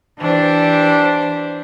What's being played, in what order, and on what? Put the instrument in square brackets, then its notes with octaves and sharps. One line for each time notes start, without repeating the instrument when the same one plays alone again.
[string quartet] E3 D4 G4 C5